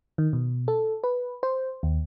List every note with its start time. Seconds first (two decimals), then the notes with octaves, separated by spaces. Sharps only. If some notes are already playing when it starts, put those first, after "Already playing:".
0.18 D#3
0.33 B2
0.68 A4
1.04 B4
1.43 C5
1.83 D#2